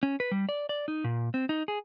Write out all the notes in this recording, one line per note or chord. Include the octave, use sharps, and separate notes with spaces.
C#4
B4
G3
D5
D5
D#4
A#2
C4
D#4
G#4